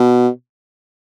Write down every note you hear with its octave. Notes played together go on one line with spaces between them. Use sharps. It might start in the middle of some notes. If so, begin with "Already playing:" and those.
Already playing: B2